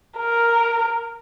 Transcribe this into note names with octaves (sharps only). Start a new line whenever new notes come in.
A#4